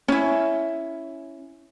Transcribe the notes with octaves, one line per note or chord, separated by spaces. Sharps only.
C#4 E4